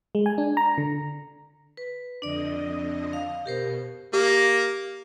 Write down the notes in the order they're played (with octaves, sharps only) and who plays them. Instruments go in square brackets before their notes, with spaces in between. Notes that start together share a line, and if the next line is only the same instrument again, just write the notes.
[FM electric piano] G#3
G#5
D4
A#5
D3
[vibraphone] B4
[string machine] F2 D3 D#5 [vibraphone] D4 D5
[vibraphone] F5
[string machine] B2 [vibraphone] G4 A#4 C5
[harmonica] A#3 [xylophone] G4